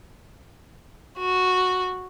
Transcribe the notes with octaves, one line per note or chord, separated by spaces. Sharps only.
F#4